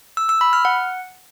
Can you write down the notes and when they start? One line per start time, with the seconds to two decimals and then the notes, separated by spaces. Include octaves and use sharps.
0.17 E6
0.29 E6
0.41 B5
0.53 F6
0.65 F#5